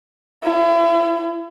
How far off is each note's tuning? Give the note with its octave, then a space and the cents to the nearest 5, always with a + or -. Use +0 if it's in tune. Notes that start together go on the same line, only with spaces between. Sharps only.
E4 +35